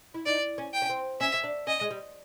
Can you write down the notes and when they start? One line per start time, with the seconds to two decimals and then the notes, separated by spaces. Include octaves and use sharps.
0.14 E4
0.26 D#4 D5
0.58 C#4
0.73 G5
0.82 C#4
0.89 C4
1.20 C#4 E5
1.34 C#4
1.44 D4
1.67 C#4 D#5
1.81 G#3
1.90 G3